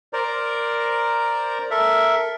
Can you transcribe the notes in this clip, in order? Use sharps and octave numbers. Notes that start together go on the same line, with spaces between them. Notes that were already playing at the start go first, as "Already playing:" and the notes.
A#4 C5 D5 A#5
A4 A#4 E5